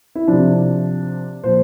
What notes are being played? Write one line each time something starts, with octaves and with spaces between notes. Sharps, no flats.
E4
C3 F3 D4
A#2 F3 C5